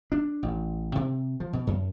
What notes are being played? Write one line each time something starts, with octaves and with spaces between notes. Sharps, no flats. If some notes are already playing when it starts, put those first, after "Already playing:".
D4
A1
C3
F3
B2
F#2